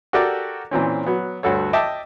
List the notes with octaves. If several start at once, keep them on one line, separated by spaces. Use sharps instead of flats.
F#4 G4 A4 A#4 D5 G5
A#2 E3 C4 C#4
F#3 B3
D2 G2 F#4 A4 C#5
D#5 E5 G5 A5 D6